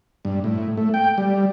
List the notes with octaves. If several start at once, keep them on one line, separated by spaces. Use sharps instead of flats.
G2
A2
A3
G5
G3